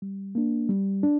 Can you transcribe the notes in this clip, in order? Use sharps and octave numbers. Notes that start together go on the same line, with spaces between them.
G3
A#3 D4
G3
D4